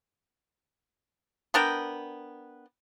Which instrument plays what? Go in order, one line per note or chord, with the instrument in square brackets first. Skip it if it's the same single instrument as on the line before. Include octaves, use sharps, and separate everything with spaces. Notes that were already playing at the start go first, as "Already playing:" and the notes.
[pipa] B3 D4 A#4 G5